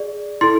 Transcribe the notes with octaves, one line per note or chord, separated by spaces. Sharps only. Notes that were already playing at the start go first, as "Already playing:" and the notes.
Already playing: G#4 D5
E4 A4 C6